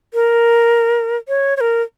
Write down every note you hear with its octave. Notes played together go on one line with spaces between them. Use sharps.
A#4
C#5
C#5
A#4